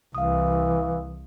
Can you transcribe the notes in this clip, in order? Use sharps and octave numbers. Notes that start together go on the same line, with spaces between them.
C2 E3 F5 D#6